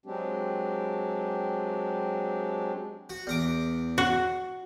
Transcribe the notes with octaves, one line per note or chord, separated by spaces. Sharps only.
F#3 G#3 C4 D4 G4
F#4
E2 A#5 D6
F#4